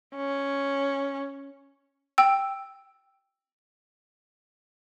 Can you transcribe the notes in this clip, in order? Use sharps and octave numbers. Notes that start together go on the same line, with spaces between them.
C#4
G5 E6